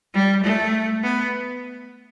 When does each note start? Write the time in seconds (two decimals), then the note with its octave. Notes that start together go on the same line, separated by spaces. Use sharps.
0.14 G3
0.44 A3
1.03 B3